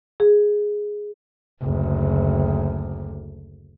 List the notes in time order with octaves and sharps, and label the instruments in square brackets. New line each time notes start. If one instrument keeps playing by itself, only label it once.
[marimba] G#4
[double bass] F#1 D2